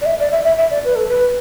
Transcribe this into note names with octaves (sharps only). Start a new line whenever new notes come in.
D5
E5
D5
E5
E5
E5
D5
B4
A4
B4